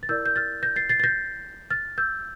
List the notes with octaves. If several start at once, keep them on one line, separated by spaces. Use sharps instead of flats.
A6
E4 A#4 D5 E6 G6
G6
F6 A6
G6 A#6
A6 C7
A6 C7
A6
G6 A#6
F6 A6
E6 G6